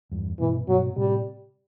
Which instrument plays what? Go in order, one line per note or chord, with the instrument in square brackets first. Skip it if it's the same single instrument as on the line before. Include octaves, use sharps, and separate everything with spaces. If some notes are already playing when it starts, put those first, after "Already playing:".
[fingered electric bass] E2 G2
[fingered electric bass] G2 B2 [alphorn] E3
[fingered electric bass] G2 B2 [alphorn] F#3
[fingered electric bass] A2 C3 [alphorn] G3